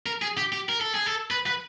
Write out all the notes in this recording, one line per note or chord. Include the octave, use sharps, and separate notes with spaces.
A#4
G#4
G4
G4
A#4
A4
G#4
A4
B4
B4